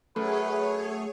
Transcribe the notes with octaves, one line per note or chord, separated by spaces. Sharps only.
F#2 A3 G#4 B4 C#5